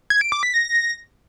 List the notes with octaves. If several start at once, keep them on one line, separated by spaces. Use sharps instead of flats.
G#6
D7
D6
B6
A#6